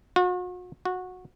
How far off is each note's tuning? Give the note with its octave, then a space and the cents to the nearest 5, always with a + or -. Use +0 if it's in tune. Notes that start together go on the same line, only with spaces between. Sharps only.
F#4 -40
F#4 -15